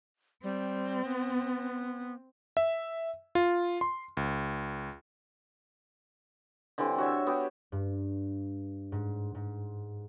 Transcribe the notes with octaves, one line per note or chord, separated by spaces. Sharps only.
G3 C4
B3
E5
F4
C6
C#2
D3 E3 G3 C4
F#4 C#5 E5
B3 F#4 G4
G2
G#2
G#2